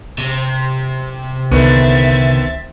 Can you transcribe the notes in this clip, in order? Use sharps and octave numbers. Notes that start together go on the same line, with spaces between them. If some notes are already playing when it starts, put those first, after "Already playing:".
C3
C2 D3 D#3 B3 C4 E5 A6